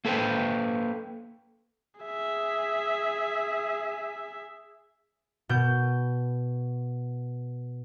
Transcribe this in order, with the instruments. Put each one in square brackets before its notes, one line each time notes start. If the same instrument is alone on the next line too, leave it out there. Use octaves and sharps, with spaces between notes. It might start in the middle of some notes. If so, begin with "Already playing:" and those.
[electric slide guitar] A#3 A4 B4 C5 G5
[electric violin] G#4 E5
[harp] B2 G6